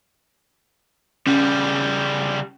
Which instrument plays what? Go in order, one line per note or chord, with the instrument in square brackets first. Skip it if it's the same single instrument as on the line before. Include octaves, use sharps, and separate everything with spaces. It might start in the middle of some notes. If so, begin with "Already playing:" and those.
[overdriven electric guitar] C#3 G3 [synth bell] C#4